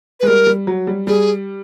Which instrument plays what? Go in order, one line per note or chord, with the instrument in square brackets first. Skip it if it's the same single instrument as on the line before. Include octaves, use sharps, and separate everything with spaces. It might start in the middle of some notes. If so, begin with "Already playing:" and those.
[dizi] B4
[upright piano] G#3
[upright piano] G3 [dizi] A#4
[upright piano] G3
F#3
G3
[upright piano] G3 [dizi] G#4